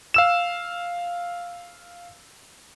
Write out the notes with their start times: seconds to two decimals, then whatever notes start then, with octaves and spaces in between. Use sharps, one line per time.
0.14 F5 E6 E7